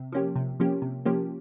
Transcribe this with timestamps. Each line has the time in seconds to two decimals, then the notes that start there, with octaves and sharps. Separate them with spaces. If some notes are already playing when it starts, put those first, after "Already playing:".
Already playing: C3
0.12 F3 A#3 C#4 G4
0.36 C3
0.60 F3 A#3 C#4 G4
0.82 C3
1.06 F3 A#3 C#4 G4